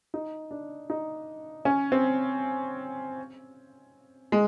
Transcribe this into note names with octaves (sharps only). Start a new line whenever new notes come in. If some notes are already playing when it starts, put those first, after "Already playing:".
D#4
D4
D#4
C#4
C4
G#3